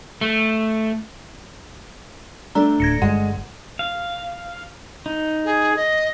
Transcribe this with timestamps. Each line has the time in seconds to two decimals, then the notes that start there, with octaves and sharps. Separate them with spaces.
0.21 A3
2.55 A3 D4 A#5
2.80 D1 G#6 A#6 C#7
3.02 G1 G#3 F#5
3.79 F5
5.06 D#4
5.45 G#4
5.76 D#5